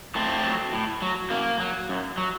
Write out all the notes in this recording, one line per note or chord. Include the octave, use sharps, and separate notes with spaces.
A2 A3 C4
F#3
A2
F#3
F#2 A#3
F#3
F#2
F#3